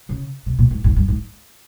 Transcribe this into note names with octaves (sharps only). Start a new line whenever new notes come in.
C#3
C3
A#2
G#2
G#2
G2
G#2